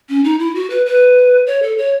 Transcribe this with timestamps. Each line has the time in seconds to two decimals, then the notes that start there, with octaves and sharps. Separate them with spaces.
0.09 C#4
0.24 D#4
0.39 E4
0.55 F#4
0.70 B4
0.86 B4
1.47 C#5
1.63 A4
1.78 C#5